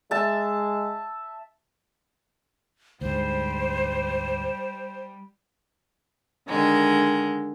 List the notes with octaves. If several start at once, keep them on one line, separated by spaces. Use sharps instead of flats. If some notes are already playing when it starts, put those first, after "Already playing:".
G#3 E5 A5
D2 G#2 G3 C5
D3 D#3 G#3 A#5